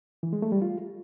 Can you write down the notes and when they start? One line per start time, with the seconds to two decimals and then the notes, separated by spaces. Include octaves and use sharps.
0.23 E3
0.33 G#3
0.42 A3
0.52 G3
0.62 F4